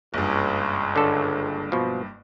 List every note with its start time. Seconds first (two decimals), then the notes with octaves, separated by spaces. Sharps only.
0.14 F#1 C#2 G2
0.96 D3 A4
1.72 B2 F3